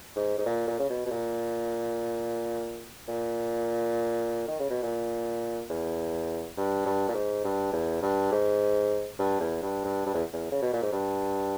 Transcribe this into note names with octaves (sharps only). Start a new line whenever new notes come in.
G#2
G#2
A#2
A#2
C#3
B2
B2
A#2
A#2
D#3
C#3
B2
A#2
E2
G2
G2
A#2
G#2
G2
E2
G2
G#2
G2
E2
G2
G2
G2
E2
E2
C#3
B2
A#2
G#2
G2